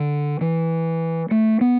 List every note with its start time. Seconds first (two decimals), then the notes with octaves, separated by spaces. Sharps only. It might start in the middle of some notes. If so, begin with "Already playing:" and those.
Already playing: D3
0.41 E3
1.31 A3
1.61 B3